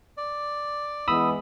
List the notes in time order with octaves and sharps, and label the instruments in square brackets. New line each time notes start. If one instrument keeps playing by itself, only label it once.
[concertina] D5
[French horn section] E3 G#3 B3 [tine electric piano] B5 D#6 E6